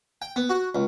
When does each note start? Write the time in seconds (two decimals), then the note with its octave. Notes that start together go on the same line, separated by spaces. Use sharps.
0.22 G5
0.36 B3
0.49 F#4
0.75 C#2